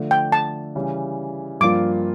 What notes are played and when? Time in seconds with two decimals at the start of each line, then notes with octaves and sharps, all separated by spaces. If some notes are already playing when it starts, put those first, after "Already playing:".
Already playing: D3 F3 A3
0.11 G5
0.32 A5
0.75 C#3 E3 G3
1.60 G2 F3 A#3 D4 F4 D6